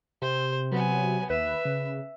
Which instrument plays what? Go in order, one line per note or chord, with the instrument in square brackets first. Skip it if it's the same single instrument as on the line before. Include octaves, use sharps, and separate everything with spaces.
[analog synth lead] C3 [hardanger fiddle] C5
[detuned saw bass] F#3 [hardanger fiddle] B3 G#5
[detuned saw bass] D#2 [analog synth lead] B4 [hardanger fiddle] E5
[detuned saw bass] C#3